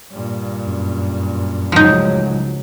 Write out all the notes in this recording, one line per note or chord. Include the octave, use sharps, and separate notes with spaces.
G2 A#2
F#2
C#2 A2 F3 F#3 D#4